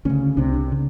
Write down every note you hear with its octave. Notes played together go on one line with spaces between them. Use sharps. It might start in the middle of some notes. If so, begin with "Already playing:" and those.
D2 C#3 C#4
C2 C3 D4
D4
C#3